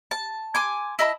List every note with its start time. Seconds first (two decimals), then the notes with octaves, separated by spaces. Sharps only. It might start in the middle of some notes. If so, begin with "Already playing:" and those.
0.11 A5
0.55 G#5 C6 D6
0.99 E4 D#5 A5 B5